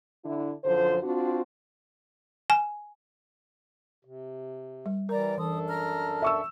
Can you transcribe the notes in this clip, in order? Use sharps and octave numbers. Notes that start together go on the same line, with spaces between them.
D3 D4 E4
F#2 D3 F3 C5
C4 D4 F4 F#4
G#5
C3
G3
E3 G3 A#4 D5 A#5
F#2 E3 D4 A4 D#6
A#5 F6
E5 C#6 E6